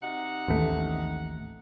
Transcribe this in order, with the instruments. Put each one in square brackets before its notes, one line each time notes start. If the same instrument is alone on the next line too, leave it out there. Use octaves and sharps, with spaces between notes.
[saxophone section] C3 D#4 F#5
[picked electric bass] A1 D#2 A3